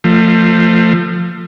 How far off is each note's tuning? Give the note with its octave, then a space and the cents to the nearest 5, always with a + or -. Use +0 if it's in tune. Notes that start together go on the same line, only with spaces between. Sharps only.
F3 +0 A3 +30